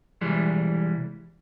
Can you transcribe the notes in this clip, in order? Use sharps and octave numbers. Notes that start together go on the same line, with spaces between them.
C2 E3 G3 G#3